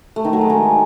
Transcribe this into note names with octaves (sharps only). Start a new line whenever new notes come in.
A3
D#3
F#3
G#3
D#3